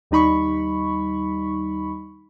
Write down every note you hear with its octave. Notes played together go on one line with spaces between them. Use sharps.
D#2 G3 D#4 B5 C#6